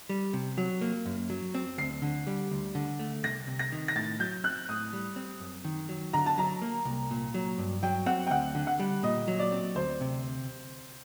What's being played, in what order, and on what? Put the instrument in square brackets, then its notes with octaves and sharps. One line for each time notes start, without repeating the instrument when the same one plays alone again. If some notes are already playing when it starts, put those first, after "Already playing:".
[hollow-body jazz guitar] G3
C3
F#3
A#3
F#2
F#3
C4
[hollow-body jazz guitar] D2 [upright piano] C7
[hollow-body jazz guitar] D3
G3
D2
D3
A3
[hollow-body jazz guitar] C2 [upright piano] A#6
[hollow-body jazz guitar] C3
[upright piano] A#6
[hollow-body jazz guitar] D#3
[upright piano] A#6
[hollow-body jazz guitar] A2 [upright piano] A6
[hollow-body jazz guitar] F#3 [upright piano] G6
[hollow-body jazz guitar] C4 [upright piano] F#6
[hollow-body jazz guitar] A2 [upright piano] D#6
[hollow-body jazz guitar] G3
C4
F#2
D#3
F#3
[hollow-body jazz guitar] D3 [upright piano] A#5
[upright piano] A5
[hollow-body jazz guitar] F#3 [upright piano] A#5
[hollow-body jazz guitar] A#3
C2
A#2
F#3
G2
[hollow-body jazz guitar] F#3 [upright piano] G5
[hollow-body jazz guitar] C4 [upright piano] F#5
[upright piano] G5
[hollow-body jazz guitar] D2 [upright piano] F#5
[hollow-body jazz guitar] D3
[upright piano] F#5
[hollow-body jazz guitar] G3
[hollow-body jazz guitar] A#2 [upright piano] D#5
[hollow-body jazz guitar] F#3
[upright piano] D5
[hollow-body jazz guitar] C4
[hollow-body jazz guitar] D2 [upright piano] C5
[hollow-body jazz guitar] C3